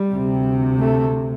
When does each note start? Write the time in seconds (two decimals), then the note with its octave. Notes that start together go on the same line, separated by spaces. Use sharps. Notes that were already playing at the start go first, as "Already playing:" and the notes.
Already playing: G3
0.10 D2 C3
0.77 A3